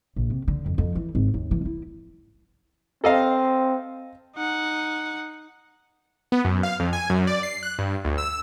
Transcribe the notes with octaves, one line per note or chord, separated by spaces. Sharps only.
A#1
C3
D3
F2
F2
E3
G#1
D#2
E3
E4
C4 A4 D#5 F5
D#4 F#5
B3
F#2
F5
F2
G#5
F#2
D5
C7
F#6
G2
D2
E6